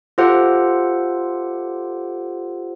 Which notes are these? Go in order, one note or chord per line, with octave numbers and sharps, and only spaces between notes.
F4 G4 A4 C5 F#5